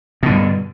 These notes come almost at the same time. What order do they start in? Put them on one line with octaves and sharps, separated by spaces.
B2 D3 G2